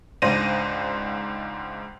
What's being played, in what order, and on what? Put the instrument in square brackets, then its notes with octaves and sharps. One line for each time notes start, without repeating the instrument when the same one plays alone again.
[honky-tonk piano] C#2 G#2 D4 C5 A#6 D#7